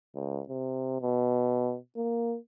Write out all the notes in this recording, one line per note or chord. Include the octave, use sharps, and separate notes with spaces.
C#2
C3
B2
A#3